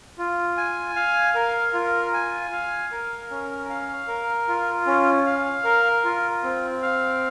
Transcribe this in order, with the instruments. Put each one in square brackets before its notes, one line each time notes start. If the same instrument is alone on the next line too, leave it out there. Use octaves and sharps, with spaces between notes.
[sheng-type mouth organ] F4
G#5
F5
A#4
F4
G#5
F5
A#4
C#4
F5
A#4
F4
C#4
F5
A#4
F4
C4
F5